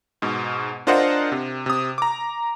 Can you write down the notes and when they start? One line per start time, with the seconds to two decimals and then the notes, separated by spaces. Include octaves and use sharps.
0.22 G#2 B2
0.87 D4 F4 A#4 C5 D#5 F#5
1.32 C3
1.66 C3 D#6
1.98 A#5 D6